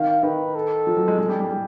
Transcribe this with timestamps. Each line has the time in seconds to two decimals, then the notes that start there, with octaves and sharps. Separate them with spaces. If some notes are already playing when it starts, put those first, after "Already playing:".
Already playing: D#3 F5
0.23 D#3 B4
0.55 A4
0.87 F3
0.97 F#3
1.08 G#3
1.18 G#3
1.29 G3
1.40 G3
1.51 G3